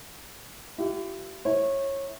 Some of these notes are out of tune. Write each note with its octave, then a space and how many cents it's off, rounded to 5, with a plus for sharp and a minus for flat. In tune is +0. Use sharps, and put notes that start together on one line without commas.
E4 +40 G4 -35
E4 +0 C#5 -20